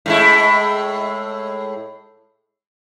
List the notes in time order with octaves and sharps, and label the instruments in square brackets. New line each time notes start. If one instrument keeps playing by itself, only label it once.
[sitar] A2 G#3 E4